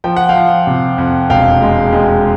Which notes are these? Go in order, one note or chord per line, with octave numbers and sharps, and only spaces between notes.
F3 G5
F#5
F5 G5
F3
C3
F2
E1 F5 G5
G#3
G#3